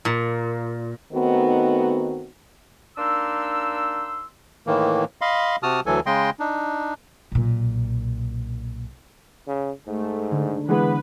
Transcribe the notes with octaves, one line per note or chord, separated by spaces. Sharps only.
A#2
D#3 A3 B3 C4 D#4 F#4
A#3 D4 D#4 C6 E6
A2 D#3 E3 A#3
D#5 F5 B5 C6
C3 F#4 A5 D#6 F6
D2 E3 F#3 A4 G#5
C#3 G#3 D#5 G5 C6
D4 D#4
B1 A#2
C#3
G#2 A3
D3
E3 G#3 B3 B4